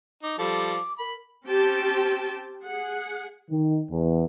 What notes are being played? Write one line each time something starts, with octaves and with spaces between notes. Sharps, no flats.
D#4 D6
F3 G3 A4 D6
A#4 B5
C4 C#4 G4 G5 A5
G#4 F#5
D#3
E2